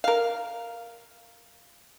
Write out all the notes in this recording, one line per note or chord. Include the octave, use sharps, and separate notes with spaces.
A#4 F5